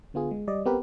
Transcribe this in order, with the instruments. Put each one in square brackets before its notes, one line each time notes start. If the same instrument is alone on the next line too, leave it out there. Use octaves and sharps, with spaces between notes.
[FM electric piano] D3 B3 F4 G#4
G#3
G3 D5 D#5
B3 C4 G4 A#4 B4